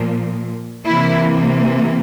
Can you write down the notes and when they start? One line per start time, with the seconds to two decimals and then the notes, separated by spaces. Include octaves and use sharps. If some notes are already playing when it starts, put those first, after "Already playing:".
Already playing: A#2 F3 A#3
0.85 C3 E3 A#3 E4